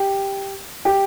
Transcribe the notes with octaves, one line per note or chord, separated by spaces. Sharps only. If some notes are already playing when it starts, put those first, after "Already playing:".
Already playing: G4
G4